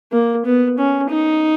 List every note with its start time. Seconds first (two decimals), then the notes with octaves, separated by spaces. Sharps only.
0.12 A#3
0.45 B3
0.78 C#4
1.10 D#4